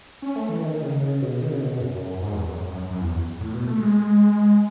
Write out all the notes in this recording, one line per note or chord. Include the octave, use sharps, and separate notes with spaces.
C#4
A3
E3
D#3
C#3
C#3
B2
D#3
C#3
B2
B2
F#2
G#2
E2
F#2
F#2
F#2
E2
A2
B2
A3
G#3